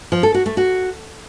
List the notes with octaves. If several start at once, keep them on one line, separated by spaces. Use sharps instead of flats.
F3
A4
F#4
A3
F#4